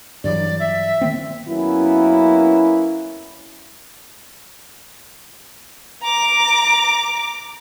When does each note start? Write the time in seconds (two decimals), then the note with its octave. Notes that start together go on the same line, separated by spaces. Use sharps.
0.24 G2 E3 F#3 D5
0.60 E5
1.01 D#3 A#3 C4
1.47 F#2 A#3 B3 C#4 E4
6.03 A#5 D6